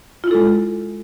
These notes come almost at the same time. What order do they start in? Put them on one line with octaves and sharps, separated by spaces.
F4 E4 A4 G#3